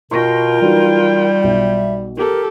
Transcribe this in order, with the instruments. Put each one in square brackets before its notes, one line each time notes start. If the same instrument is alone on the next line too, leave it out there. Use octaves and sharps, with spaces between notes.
[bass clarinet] B2 [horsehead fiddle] F4 G5 [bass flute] A#4 [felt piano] C6 C#6 A#6
[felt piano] E3 F#3 D#4 [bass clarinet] G3
[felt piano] B1 [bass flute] E5
[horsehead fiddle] G4 A4 [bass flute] A#4